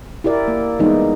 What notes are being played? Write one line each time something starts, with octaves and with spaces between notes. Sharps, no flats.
E4 G4 A#4 D5
A#3
E3 G3 G#3 B3 D#4